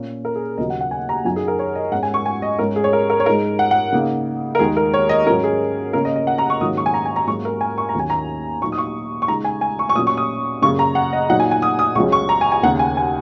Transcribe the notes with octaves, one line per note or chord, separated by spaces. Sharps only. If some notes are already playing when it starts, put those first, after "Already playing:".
Already playing: A#2 A#3 C#4
A#4
G#4
D#2 C#3 F#3 D#5
F#5
F#5
G#5
A#5
F#2 F#3 D#4 G#5
G#4
A#4
C#5
D#5
G#2 G#3 C#4 F#5
G#5
C#6
G#5
D#5
G#2 G#3 C#4 A#4
G#4
C#5
A#4
A#4
C#5
G#2 G#3 D#4 A#4
F#5
F#5
C#3 A#3 D#4
A#4
D#2 D#3 G#3 D#4 G#4
A#4
C#5
D#5
G#2 F#3 C#4 A#4
G#4
C#3 A#3 C#4 A#4
D#5
D#5
F#5
A#5
C#6
G#2 D#3 F#3 A#3 C#4 D#6
C#6
G#5
A#5
G#5
A#5
G#2 F#3 A#3 C#4 C#6
A#4
G#5
C#6
A#5
D#2 D#3 F#3 C#4 G#5
A#5
A#2 F#3 A#3 D#4 C#6
D#6
C#6
C#6
C#3 G#3 D#4 A#5
G#5
G#5
C#6
C#6
A#2 F#3 C#4 D#6
C#6
D#6
F#2 C#3 A#3 C#6
A#5
F#5
D#5
A#2 F#3 D#4 F#5
G#5
G#5
D#6
D#6
C#2 C#3 F#3 C#4 C#6
C#6
A#5
G#5
G#5
D#2 C#3 A#3 F#5
G#5
G#5